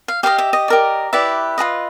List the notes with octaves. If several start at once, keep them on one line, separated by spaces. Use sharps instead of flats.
F5
G4 B4 D#5 F5
E5
D#5
G4 A#4 D5
E4 G4 B4 D5 E5
F4 G#4 B4 D#5